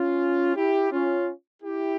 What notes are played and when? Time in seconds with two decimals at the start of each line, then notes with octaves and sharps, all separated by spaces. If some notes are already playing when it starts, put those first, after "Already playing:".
Already playing: C#4 F4
0.55 E4 G4
0.92 C#4 F4
1.63 E4 G4